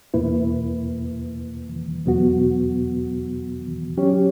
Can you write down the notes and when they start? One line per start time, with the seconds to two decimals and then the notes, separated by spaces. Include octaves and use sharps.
0.14 E2 B2 A#3 E4 B4
2.05 E2 B2 F#3 B3 F#4
3.97 F#3 C#4 G4 C#5